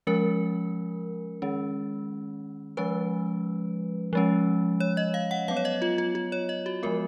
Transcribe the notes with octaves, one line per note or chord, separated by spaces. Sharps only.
F3 G#3 C#4 A#4
D#3 G#3 C#4
F3 G#3 C#4 B4
F3 G#3 C#4
C#5
D#5
F5
F#5
F#3 B3 F5
C#5
D#5
F4
F4
F4
C#5
D#5
F#4
F3 G#3 B3 A#4